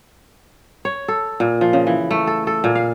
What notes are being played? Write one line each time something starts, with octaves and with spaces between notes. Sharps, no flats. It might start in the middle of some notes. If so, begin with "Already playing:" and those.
C#5
A4
A#2
F3
C#3
E3
A3
A4
A4
A#2
F5